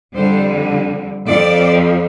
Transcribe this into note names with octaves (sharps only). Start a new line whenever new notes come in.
F2 D3 G3 C5
F2 F3 D5